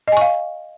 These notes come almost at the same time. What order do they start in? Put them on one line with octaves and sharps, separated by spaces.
D#5 G#5 C#6 F5